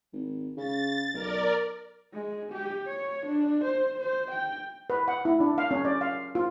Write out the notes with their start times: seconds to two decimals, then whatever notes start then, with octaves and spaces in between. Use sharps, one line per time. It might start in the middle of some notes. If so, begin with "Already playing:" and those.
0.13 G#1
0.57 C#3 A6
1.14 B1 A#4 D5
2.14 G#3
2.53 G4
2.87 C#5
3.27 D4
3.65 C5
4.00 C5
4.31 G5
4.90 B4
5.08 F#5
5.25 E4
5.40 D4
5.58 F5
5.71 C#4
5.85 D5
6.01 F5
6.35 F4